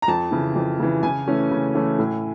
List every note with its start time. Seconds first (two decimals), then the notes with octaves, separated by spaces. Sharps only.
0.02 A#5
0.08 F2 A5
0.31 C#3 E3
0.55 F2
0.79 C#3 E3
1.03 C#3 G#5
1.28 E3 A3 C#4
1.51 C#3
1.75 E3 A3 C#4
1.99 A2